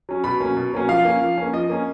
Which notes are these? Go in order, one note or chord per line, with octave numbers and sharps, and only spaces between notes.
F#3 C#4
B2 B5
F#3 A#3 C#4
B2
F#3 A#3 C#4
F3 F5
A#3 C#4
F3
A#3 C#4
F3 D#5
A#3 C#4